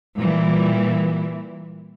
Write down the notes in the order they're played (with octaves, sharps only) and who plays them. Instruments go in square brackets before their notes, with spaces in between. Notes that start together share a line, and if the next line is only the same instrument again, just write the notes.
[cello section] A#2 E3 G3